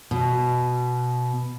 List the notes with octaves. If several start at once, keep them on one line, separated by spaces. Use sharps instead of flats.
B2